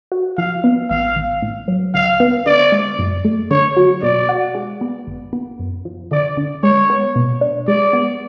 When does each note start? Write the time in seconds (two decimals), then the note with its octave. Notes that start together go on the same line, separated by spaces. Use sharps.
0.12 F#4
0.37 F3 F5
0.64 B3
0.90 A1 F5
1.16 A1
1.42 A2
1.68 F#3
1.94 D2 F5
2.20 B3
2.46 D3 D5
2.72 G#3
2.99 F#2
3.25 A3
3.51 D3 C#5
3.77 F#3
4.02 B2 D5
4.29 F#4
4.55 G#3
4.81 B3
5.07 G#1
5.33 B3
5.59 F#2
5.85 F3
6.11 D3 D5
6.37 D3
6.63 G#3 C#5
6.90 B3
7.16 B2
7.41 D4
7.67 G#3 D5
7.93 B3